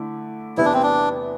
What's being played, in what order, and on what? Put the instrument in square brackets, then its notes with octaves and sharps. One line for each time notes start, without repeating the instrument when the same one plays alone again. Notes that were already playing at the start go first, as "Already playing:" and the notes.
Already playing: [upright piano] D3 A3 E4
[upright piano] E2 C3 E3 B3 [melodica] E4
[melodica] D4
C4
D4